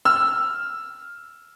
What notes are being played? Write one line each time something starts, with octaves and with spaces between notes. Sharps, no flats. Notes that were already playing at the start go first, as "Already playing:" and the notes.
E6 F6